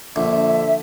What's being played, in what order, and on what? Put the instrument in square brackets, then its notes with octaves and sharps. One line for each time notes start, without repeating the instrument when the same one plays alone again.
[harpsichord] A#1 [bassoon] D3 [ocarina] E5